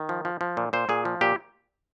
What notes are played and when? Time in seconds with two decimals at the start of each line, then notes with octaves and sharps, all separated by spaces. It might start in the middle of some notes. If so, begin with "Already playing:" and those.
Already playing: D#3
0.09 F3
0.25 F3
0.41 F3
0.57 A#2
0.73 A#2 C5
0.89 A#2 G#4
1.05 F3
1.21 A#2 G4